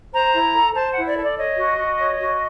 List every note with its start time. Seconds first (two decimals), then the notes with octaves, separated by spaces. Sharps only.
0.12 C5 A#5
0.33 E4
0.53 A4
0.74 C5 A5
0.90 F#5
0.95 E4
1.06 D5
1.15 A4
1.21 D5
1.36 C#5 D#5
1.57 F#4
1.77 F#4
1.98 C#5
2.19 F#4